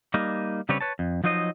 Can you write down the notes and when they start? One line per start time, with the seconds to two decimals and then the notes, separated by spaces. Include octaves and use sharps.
0.14 G3 A#3 D#4
0.69 C#3 G3 C4 D4 B4 C#5
0.81 B4 C#5 A5
0.99 F2
1.24 F3 F#3 D#4 C5 D#5